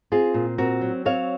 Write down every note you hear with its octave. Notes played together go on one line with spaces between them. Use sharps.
C4 F4 G#4
A#2
C4 F#4 A#4
F#3
C4 C#5 F5